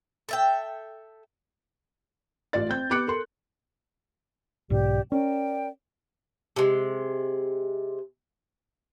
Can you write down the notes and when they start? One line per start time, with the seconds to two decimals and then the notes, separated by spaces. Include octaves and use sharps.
0.29 A4 E5 G5
2.53 A1 F4 D5 A6
2.69 C4 G6
2.90 B3 G4 D6 F#6 C#7
3.08 A4 A#4 C6
4.70 B1 G#2 B2 G4 D5
5.12 C#4 A#4 D5 G5
6.56 C3 G#3